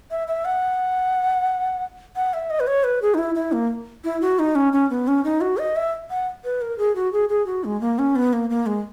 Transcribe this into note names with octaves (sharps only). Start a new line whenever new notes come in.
E5
E5
F#5
F#5
E5
D#5
B4
C#5
B4
G#4
D#4
E4
E4
A#3
E4
F#4
D#4
C#4
C#4
B3
C#4
D#4
F#4
D#5
E5
F#5
B4
A#4
G#4
F#4
G#4
G#4
F#4
G#3
A#3
C#4
B3
A#3
A#3
G#3